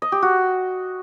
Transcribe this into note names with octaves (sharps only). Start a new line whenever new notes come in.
D#5
G4
F#4